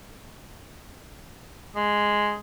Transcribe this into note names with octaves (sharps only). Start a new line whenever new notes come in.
G#3